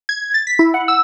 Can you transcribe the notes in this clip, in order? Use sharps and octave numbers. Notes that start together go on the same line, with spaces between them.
G#6
A6
B6
E4
F#5
E6